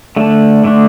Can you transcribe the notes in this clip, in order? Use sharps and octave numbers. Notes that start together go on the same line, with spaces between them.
D3 A3 D4
D3 A3 D4